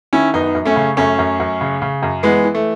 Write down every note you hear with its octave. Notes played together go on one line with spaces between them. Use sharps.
D#3 C#4 E4
F#2 B3 D#4
F#2
A3 C#4
C#3
F#2 A3 C#4
F#2
F#2
C#3
C#3
F#2
E3 G#3 B3
E3
A3